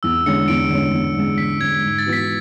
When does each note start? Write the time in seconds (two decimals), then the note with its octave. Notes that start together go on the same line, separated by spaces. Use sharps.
0.03 E2 E6
0.26 D3 G#3 C#4 C#7
0.48 E2 D7
0.70 D3 G#3 C#4
0.93 E2
1.16 D3 G#3 C#4
1.38 E2 B6
1.60 D3 G#3 C#4 G#6
1.83 G#2
1.99 A6
2.06 E3 B3 F#4
2.13 B6